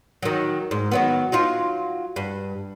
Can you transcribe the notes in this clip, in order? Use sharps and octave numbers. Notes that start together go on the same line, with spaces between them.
D#3 F#3
G#2
D#3 F#3 B3
F#3 D#4 F4
G2